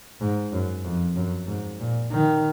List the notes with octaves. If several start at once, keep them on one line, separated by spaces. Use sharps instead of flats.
G#2
F#2
F2
F#2
G#2
A#2
D#3